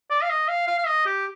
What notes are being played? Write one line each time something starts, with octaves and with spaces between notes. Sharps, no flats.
D5
F5
D#5
F5
F5
F5
D#5
G4